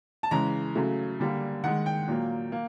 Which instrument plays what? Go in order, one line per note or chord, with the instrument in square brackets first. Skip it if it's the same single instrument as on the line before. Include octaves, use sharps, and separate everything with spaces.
[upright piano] A5
C#3 E3 G#3 A#5
C#3 F#3 A3
D3 G3 A#3
D#3 G#3 F#5
G5
A#2 F#3 A#3
A#3